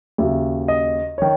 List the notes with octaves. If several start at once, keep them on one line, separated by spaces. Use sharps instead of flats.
D#2 C#3 F#3 E5
D#5
D#3 C#5